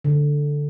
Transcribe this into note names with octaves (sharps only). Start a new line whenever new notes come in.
D3